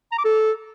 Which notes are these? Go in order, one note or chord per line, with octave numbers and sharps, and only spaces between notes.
A#5
D6
A4